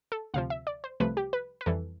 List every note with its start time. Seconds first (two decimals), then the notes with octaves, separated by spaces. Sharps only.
0.12 A4
0.34 D2 C3 F3 F5
0.50 E5
0.67 D5
0.84 C5
1.00 C2 C3 F3 A3 B4
1.17 G4
1.33 B4
1.61 B4
1.66 F2 E3 G3 A4